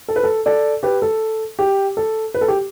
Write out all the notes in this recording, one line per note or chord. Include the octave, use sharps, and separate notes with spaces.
A4
B4
A4
A4 D5
G4 B4
A4
G4
A4
B4
A4
G4